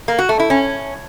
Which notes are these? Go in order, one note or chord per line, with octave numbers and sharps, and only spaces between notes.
A#3
F#4
A3
E4
C#4